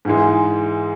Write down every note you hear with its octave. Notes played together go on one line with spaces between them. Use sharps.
G#2 E3 G#3